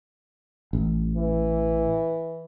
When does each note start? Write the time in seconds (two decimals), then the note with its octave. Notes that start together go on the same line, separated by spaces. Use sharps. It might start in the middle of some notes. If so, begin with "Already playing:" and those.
0.73 A1
1.17 E3